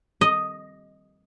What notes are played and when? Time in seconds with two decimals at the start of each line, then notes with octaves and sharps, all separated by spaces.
0.21 D#5